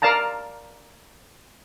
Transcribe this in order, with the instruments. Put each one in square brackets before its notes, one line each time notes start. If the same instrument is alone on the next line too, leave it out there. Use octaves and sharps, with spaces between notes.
[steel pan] A#4 D5 F5 A5 A#5